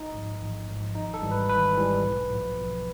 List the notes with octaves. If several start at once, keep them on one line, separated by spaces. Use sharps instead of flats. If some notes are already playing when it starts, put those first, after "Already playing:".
Already playing: A1 D#4
G#2 F3
A1
G#2 F3
G#1 D#4
A4
G#2 E3 G3
B4
G#1 B4
G#2 E3 G3
B1
A2 F3
B1